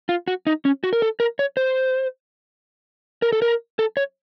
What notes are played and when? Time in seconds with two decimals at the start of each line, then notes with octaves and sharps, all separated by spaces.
0.09 F4
0.28 F#4
0.47 D#4
0.65 C#4
0.84 F#4
0.93 A#4
1.02 A4
1.20 A#4
1.39 C#5
1.57 C5
3.22 A#4
3.32 A4
3.42 A#4
3.79 A4
3.97 C#5